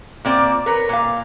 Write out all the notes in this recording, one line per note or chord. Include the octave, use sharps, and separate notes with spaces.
A#2 C4 D5
A#4 B4 C#5
A#2 F5